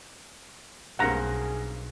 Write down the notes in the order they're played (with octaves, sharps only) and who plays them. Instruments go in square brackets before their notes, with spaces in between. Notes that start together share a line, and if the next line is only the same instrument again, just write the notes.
[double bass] B1 [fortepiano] G2 A#3 C4 [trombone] G#4 [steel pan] F#5 A#5